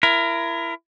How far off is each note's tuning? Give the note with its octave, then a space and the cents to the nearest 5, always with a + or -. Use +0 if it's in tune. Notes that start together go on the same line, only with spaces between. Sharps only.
E4 +25 A#4 +0